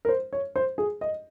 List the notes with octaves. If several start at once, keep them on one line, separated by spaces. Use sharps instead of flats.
A#4
C5
C#5
C5
G#4
D#5